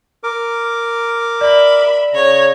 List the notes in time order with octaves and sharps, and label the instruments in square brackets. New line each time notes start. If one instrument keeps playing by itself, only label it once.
[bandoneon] A#4 D6
[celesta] D5 [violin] E5 B5
[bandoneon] C#3 [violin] C#5 A#5